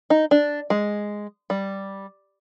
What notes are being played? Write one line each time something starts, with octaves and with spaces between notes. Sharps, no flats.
D#4
D4
G#3
G3